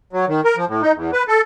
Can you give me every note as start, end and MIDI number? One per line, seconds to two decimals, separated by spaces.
0.13 0.25 54
0.28 0.41 51
0.44 0.56 70
0.57 0.65 53
0.68 0.82 45
0.82 0.92 63
0.95 1.11 40
1.13 1.23 71
1.28 1.41 69